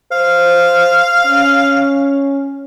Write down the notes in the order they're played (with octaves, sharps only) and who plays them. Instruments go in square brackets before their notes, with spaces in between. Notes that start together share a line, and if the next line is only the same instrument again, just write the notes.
[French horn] C5 [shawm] F5
[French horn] C#4